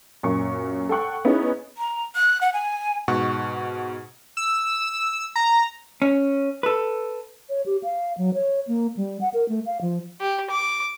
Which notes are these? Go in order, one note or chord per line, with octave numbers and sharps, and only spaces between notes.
F#2 A#2 A#3 C#6
A4 F#5 G5 C#6 F#6
B3 C#4 D#4 E4 G#4 C#5
A#5
F#6
F#5
G#5
G#2 B2 F#5 C#6
E6
A#5
C#4
A4 B4
C#5
G4
F5
F#3
C#5
A#3
G3
F#5
A#4
A3
F5
F3
G4
D6